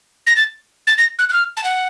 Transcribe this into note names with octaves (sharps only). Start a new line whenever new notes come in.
A#6
A6
A6
A#6
F#6
F#6
F6
A5
F#5